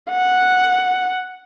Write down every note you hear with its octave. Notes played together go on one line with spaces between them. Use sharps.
F#5